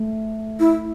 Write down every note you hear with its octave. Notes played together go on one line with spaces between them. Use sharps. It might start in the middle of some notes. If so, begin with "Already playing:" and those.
Already playing: A3
E4